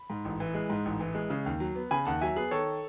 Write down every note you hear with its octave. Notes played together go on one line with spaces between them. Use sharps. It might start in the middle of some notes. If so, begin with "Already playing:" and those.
Already playing: B5
G#2
A1
E3
G#3
G#2
A1
E3
G#3
C#3
D#2
F#3
B3
C#3 G#5 B5
D#2 F#5 A5
F#3 E5 G#5
B3 G#4 B4
D#3 A4 C#5